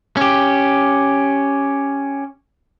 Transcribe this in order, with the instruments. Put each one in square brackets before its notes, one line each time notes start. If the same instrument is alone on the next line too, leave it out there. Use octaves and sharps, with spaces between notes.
[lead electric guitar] C#4 G4